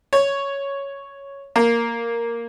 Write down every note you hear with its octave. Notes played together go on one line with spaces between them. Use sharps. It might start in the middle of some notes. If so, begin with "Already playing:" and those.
C#5
A#3